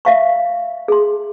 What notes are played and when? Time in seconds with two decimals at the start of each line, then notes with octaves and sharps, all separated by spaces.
0.05 E5 F5 C#6
0.88 G#4 C6